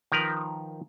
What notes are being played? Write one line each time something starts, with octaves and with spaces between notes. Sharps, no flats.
D#3 F3 A#4 B4